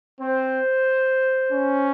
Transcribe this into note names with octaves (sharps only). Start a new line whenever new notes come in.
C4 C5
C#4